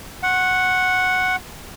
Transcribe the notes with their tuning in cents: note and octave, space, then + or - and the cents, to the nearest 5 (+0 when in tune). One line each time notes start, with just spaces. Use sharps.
F#5 +0 C#6 -45